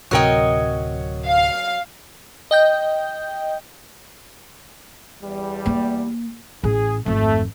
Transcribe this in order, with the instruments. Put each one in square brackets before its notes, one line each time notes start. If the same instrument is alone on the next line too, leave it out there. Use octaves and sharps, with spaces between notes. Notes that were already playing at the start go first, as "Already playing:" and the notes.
[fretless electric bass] D1 C3 [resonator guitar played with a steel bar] F#3 A#4 G5 [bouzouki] C#5 D#5
[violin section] F5
[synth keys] D#5 G5 G6
[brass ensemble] E2 G3
[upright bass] A#3
[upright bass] A1 [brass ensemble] G#4
[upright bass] G#1 F2 [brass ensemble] A3